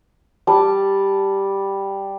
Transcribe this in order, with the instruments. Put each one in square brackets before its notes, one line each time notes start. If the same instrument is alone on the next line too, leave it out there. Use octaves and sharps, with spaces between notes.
[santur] G3 A5